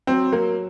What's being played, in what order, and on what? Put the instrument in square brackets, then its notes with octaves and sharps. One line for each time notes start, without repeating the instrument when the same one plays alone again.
[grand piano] F#3 [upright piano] C4
[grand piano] F#3 [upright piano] A#3